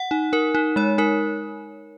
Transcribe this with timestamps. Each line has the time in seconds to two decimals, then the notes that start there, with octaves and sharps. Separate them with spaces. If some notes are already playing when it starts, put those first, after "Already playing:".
Already playing: F#5
0.11 D#4
0.33 D#4 A#4
0.55 D#4
0.76 G#3 C#5
0.98 D#4 A#4